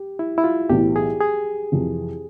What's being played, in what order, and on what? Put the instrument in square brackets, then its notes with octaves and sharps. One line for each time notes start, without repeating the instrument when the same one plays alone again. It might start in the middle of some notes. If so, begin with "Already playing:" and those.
Already playing: [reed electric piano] G4
E4
E4
F4
[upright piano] B1 A2 E3 [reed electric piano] G4
[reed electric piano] G#4
G#4
[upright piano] F2 C3 E3